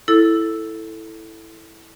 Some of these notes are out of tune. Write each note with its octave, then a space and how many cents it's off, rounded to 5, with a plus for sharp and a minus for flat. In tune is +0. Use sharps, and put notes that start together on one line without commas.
E4 +0 A4 +0